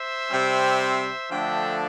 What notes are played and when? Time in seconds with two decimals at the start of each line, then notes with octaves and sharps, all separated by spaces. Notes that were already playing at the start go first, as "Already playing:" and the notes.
Already playing: C5 E5
0.29 C3 G3 C4
1.30 D3 F3 A3 D4 E5 G5